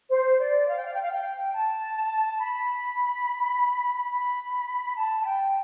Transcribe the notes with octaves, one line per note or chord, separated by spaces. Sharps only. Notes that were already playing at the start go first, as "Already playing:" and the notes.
C5
D5
F5
G5
F5
G5
F5
G5
A5
B5
B5
A5
A5
G5